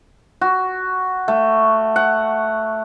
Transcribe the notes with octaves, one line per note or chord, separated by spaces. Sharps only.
F#4
A3
F#5